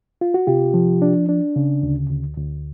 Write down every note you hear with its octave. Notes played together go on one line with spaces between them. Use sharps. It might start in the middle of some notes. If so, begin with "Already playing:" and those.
F4
F#4
C3 F4 G4
F3
D4
D4
C#3
D2
D2
D2